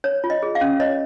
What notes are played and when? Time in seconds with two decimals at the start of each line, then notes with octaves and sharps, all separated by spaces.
0.04 C#5
0.24 F4
0.30 D#5
0.43 G#4
0.55 F5
0.61 C#4
0.80 C#5 D#5